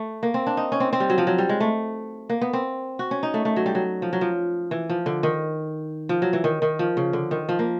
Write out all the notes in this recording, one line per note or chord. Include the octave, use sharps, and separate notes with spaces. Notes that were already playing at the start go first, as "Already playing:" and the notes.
Already playing: A3
A#3
C4
D4
D#4
C#4
C4
C4
G3
F#3
F3
F#3
G3
G#3
A3
A#3
B3
C4
F#4
C#4
D#4
A3
A3
F#3
G3
F#3
F3
F#3
F3
E3
F3
D3
D#3
F3
F#3
E3
D#3
D#3
F3
C#3
D3
D#3
F3
A#3